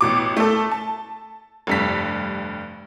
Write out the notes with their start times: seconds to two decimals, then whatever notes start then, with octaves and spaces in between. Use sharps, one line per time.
0.01 A1 B2 D6
0.37 A3 A4
0.71 A5
1.67 F1 G2 B6